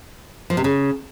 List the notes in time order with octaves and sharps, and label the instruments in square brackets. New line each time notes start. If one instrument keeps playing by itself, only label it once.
[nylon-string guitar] F3
C3
C#3